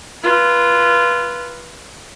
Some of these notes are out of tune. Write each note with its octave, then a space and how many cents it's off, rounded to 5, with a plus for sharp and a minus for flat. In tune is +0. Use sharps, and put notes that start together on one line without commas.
F4 -20 B4 -20